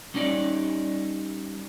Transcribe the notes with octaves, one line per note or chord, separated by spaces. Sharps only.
G3 C#4 D#4 D5